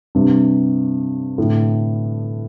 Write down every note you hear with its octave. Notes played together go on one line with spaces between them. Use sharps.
G2 C3
A2 D3